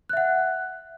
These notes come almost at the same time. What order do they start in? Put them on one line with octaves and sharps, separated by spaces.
F#6 E5 F#5